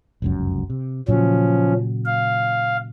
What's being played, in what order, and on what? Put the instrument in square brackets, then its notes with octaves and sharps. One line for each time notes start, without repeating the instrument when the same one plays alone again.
[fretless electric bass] F1 C#2 F#2
C3
[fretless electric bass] A#2 C#3 F#3 [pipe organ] F3 C#4
[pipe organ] F5